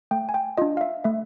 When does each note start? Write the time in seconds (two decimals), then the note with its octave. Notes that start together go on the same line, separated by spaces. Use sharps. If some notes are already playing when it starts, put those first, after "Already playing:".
0.11 A3 G5
0.29 G#5
0.34 G5
0.58 D4 F4 D#5
0.77 F5
0.81 E5
1.04 A3 E5